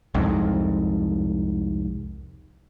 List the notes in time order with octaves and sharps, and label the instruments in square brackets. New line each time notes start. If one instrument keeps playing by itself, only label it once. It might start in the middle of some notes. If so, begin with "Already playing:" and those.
[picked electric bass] C2 F2 G#2